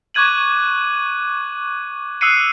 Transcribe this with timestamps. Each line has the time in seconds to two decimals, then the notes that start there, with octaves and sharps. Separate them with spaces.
0.14 C#6 D6 F#6 G#6 D#7 F#7
2.21 D#6 E6 F#6 C7 C#7 D#7